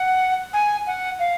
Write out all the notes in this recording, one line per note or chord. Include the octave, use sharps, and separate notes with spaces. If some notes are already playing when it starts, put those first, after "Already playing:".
Already playing: F#5
G#5
F#5
F5